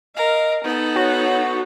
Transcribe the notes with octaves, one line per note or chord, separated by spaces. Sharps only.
A#4 D#5 F5
B3 D#4 A4
F#4 C#5